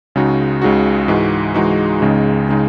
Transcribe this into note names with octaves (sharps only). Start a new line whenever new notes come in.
C#2 C#3 G#3 D#4 F#4
C#2 C#3 G#3 D#4 F#4
G#2 E3 G#3 D#4 F#4
G#2 E3 G#3 D#4 F#4
C#2 C#3 G#3 D#4
C#3 G#3 D#4